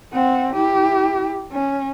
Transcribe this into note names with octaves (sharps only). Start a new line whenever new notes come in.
C4 F#5
E4 G4
C#4